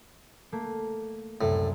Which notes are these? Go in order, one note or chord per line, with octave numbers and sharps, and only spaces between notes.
A3 A#3
C2 F#2 A2